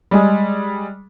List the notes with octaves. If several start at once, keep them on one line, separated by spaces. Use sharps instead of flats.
G3 G#3 G#4